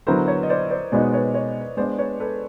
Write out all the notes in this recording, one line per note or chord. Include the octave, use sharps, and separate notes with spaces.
D3 F#3 B3 E4 A#4 C5
B4 C#5
D#5
C5 D5
C5 D5
B2 G#3 B3 D#4 C5 D5
B4 C#5
C#5 D#5
G#3 B3 D4 C5 D5
B4 C#5
A4 B4